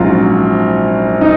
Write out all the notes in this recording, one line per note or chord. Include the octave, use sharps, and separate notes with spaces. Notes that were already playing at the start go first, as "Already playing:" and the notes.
Already playing: A#1 G#2 F#3 C#4 F4
D#4